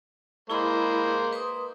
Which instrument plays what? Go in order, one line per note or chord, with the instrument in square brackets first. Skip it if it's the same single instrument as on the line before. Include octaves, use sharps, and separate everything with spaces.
[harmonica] G#3 A#3 C5 [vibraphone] E4 G#4 B5
[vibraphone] B4 C6 D#6